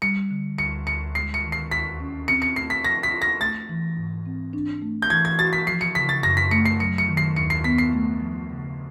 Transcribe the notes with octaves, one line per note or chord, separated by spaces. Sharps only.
G3 C#7
D3
D2 C#7
D2 C#7
G#3 C7
C#7
D#3
C7
D#2 B6
C#4
C4 C#7
C#7
A3 C7
B6
F3 A#6
B6
F4
A#6
A3 A6
E3
G#2
C4
D4
A3
G6
E3 G#6
G#6
F#4 A6
B6
F3 C7
C#7
C#3 B6
A6
F#2 A#6
B6
A3 C#7
C7
F#3 C#7
C#7
D#3
C7
D#2 C#7
C7
B3 B6
C7
A3
F3
C#3